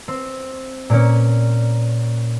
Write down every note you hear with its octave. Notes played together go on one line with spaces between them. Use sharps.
C4
A#2 A#3 C#4